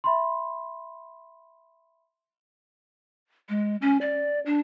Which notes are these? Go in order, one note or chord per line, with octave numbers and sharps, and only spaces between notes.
E5 B5 C6
G#3
C#4
D5
D4